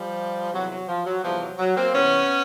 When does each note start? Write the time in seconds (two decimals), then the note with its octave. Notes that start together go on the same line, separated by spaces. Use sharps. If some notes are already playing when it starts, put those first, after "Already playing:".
Already playing: F3 G3
0.51 E2 C3 E3 F#3
0.70 F#3
0.87 F3
1.05 F#3
1.22 E2 C3 E3 F3 G3
1.40 F#3
1.58 F#3
1.76 A#3 C4
1.93 E2 C3 E3 B3 C#4